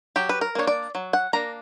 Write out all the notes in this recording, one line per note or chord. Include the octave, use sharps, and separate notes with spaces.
F#3 G4
B4
A#4
A#3 D4 C#5
D5
F#3
F#5
A#3 D4 A#5